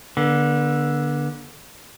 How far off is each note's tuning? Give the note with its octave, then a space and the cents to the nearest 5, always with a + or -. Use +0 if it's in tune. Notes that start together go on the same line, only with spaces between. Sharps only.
D3 +0 B3 -40